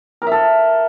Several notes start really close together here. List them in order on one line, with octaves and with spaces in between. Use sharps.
A#4 E5 A4